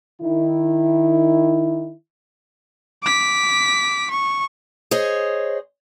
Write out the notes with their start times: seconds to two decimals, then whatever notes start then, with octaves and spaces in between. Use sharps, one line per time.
0.21 D#3 E4
3.03 D6 B6
4.11 C#6
4.91 G#4 C5 C#5 D#5